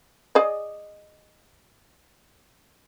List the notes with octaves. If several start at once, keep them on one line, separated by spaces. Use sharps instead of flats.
G#4 D5 D#5